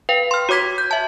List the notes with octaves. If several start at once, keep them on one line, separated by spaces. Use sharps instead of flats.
B4 F5 G5
C6 F6
F#4 C#5 D6 G#6 B6
G6
E5 A5